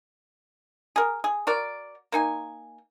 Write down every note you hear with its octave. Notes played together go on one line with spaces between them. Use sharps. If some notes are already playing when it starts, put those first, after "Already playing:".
G#4 A#4
G#4
F#4 A#4 D5
A#3 D#4 G#5